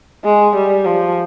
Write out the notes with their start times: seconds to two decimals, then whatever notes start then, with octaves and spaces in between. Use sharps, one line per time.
0.25 G#3
0.56 G3
0.86 F3